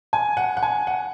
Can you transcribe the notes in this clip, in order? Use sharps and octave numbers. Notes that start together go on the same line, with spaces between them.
G#5
F#5
F#5
G#5
F#5